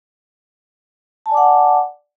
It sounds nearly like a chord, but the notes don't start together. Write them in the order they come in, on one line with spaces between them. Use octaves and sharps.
A5 G#5 D5 D6 F#5